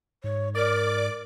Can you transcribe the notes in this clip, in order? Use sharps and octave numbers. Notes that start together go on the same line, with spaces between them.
G#2 C#5
A#4 D5 D6